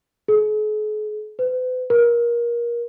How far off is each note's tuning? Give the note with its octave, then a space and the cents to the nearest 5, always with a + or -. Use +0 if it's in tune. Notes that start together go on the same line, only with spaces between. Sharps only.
G#4 +45
B4 +45
A#4 +25